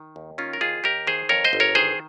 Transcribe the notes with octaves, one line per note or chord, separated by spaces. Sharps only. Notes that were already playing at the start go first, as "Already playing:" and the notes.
Already playing: D#3
D#2
D#3 C#4 F4
A#4
D#2 F4 G#4
D#2 G4 A#4
D#3 G#4 C5
F2 A#4 C#5
C5 D#5
G1
A#4 C#5
D#3 G#4 C5